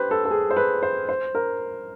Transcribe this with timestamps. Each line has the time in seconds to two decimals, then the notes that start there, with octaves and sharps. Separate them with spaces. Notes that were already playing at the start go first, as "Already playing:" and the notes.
Already playing: G4 B4 C5
0.11 A4
0.25 A4
0.31 G#4
0.50 C5
0.56 B4
0.83 C5
1.09 C5
1.35 A#4